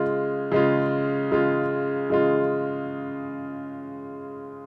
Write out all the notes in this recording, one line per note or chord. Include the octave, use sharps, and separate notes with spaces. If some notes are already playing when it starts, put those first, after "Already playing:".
Already playing: C#3 G#3 F4
C#3 G#3 F4
C#3 G#3 F4
C#3 G#3 F4